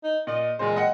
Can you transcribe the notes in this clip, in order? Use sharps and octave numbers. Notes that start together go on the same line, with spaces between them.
D#4
A#2 D#5
E1 A#2 G#3 C5
D#5 F#5 G5